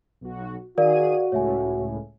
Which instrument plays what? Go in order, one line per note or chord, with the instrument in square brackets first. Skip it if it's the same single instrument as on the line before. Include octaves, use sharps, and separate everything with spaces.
[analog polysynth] B1 F#4
[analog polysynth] D#3 G#4 D#7 [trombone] F#4 [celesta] A#4 D5 F5
[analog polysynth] C#2 A2 [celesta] C#5 E5 G#5